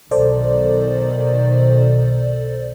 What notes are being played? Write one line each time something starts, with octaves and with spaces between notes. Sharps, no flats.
B1 D#3 A4 C5 D5